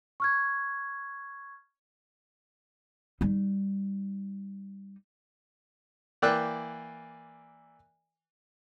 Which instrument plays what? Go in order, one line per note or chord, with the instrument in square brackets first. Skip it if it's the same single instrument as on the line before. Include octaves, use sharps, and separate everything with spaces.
[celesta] C#6 F6 G#6
[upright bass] G3 D#4
[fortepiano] E3 A#3 D5 G5 E6 F#6